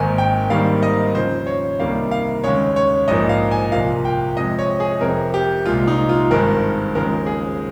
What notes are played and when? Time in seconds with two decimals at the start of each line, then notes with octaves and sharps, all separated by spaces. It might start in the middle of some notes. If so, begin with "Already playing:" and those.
Already playing: G#1 G#2 D#3 A#3 G#5
0.18 G5
0.50 G#1 G#2 D#3 G3 A#3 F5
0.83 D#5
1.15 D#2 C#3 F3 C5
1.47 C#5
1.80 C2 C3 D#3 G3 A#3 F5
2.11 F5
2.44 D#2 C#3 G#3 C#5
2.76 C#5
3.08 A#1 G#2 F3 A#3 D#5
3.29 F5
3.51 G#5
3.72 C2 A#2 F3 A#3 F5
4.05 G5
4.36 F2 C3 F3 G#3 D#5
4.59 C#5
4.80 G#4
5.01 F1 F2 C3 A#4
5.34 G4
5.66 C2 A#2 G#3 F4
5.87 D#4
6.09 F4
6.31 G#1 G2 D#3 G#3 A#4
6.95 D#2 C#3 F3 G#3 A#4
7.26 G#4